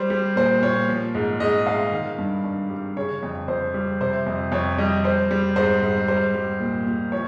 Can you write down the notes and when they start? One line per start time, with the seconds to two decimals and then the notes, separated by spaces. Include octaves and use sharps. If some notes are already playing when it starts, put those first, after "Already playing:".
Already playing: G3 C5
0.10 G3
0.36 A#2 C5
0.62 A#2 C#5
0.88 F3
1.15 G#2
1.40 G#2 D#5
1.66 G#3 F5
1.92 D#3
2.18 G2
2.44 G2
2.70 G3
2.97 C#3 C#5
3.23 F2
3.48 F2 C5
3.74 G3
4.01 C3 C5
4.26 F2
4.52 F2 C#5
4.78 G3 D#5
5.04 G3 C5
5.31 G3
5.56 G#2 C5
5.82 G#2
6.08 G3 C5
6.34 G3
6.60 A#2
6.86 A#2
7.12 F3 C#5